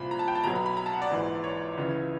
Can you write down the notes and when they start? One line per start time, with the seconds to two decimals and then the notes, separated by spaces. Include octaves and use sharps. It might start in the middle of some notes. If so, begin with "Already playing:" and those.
Already playing: C2 A#2 F3 B5
0.11 A#5
0.19 A5
0.28 G5
0.35 A5
0.43 B1 B2 F#3 A#5
0.55 B5
0.66 B5
0.77 A#5
0.86 A5
0.93 F#5
1.02 D5
1.11 A#1 G#2 E3
1.44 C#5
1.77 C#2 C#3 E3